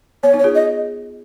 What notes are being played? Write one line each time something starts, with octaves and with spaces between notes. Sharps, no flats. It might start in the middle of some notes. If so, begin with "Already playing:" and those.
B3 C#5
B3 D#4
C#5
F4 G#4
D#5